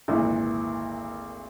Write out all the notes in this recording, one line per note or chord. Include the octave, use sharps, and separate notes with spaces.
G#1 D2 A#2 E3